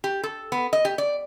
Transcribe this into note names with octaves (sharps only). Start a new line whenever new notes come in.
G4
A4
B3
D#5
G4
D5